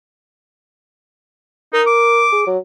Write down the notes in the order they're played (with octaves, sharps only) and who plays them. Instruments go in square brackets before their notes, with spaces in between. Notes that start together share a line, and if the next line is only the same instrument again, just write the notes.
[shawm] D#4 [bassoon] A#4
[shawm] D6
[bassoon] G#4
F#3